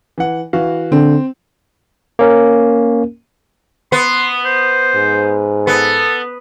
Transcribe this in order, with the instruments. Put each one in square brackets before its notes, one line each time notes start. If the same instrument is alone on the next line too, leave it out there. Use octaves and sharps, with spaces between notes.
[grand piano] E3 F#5
E3 F#4 F5
[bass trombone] D3 [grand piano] C4
[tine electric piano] A#3 C#4 A#4
[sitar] B3 [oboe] C6
[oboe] C5
[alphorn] G#2
[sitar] B3 [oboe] A4